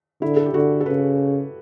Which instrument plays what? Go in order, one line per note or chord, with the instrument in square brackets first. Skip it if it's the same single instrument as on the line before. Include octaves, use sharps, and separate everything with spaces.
[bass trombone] D3 [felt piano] E4
[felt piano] A4
G4
[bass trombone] D3 [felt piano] F#4
[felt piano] A4
[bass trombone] C#3 [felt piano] B4